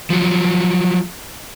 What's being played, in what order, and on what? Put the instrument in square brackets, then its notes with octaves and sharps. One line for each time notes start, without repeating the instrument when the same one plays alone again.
[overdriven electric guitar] F3 F#3